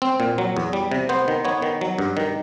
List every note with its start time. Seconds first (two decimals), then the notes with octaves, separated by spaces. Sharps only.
0.02 C4
0.20 A#2
0.38 F#3
0.57 E2
0.73 G3
0.91 C3
1.09 B3 C5
1.28 D#3
1.45 B3 C#5
1.62 D#3
1.81 F#3
1.98 G2
2.17 D#3